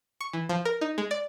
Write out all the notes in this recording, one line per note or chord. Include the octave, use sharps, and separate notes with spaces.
C#6
E3
F3
A#4
D#4
G#3
D5